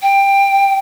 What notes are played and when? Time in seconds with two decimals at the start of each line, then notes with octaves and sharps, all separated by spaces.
0.02 G5